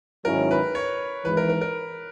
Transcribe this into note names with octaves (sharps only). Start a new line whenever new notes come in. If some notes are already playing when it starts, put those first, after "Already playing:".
G#2 D#3 F#3 C#4 E4 A#4
B4
C#5
G#1 G#2 E3 B4
A#4
A#4
A#4